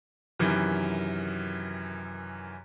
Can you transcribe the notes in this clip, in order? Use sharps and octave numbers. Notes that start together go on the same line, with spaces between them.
F#2 C3 D#3 E3